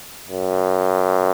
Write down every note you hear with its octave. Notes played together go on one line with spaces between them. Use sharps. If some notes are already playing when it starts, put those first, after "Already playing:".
F#2